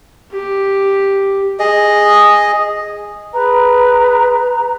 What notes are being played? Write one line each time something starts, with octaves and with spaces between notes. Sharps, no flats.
G4
G#4 D#5
G#4 B4 A#5